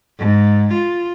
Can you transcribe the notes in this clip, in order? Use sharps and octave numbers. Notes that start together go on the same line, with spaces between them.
G#2
F4